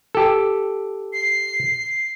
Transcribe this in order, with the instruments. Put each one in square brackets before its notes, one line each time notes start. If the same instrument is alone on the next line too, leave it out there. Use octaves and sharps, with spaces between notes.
[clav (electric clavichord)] G4 A4
[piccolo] C7